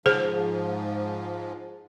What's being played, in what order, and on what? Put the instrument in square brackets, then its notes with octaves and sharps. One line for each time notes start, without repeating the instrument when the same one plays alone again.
[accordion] G#2 F3 [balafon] G#4 C5